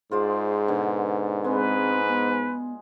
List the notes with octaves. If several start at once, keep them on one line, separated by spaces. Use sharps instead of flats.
G#2 F4 G#4 C5 D5
B2 D3
G#3 C4 B4
B3